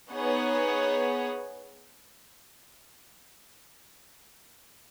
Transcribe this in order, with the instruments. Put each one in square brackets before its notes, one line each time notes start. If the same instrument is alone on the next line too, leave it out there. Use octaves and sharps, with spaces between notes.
[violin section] B3 D#4 G#4 C#5 F#5